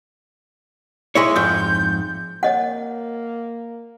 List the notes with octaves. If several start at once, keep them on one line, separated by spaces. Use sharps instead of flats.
G#3 E4 C#5
F2 G#2 G6
A#3 C#5 D#5 F#5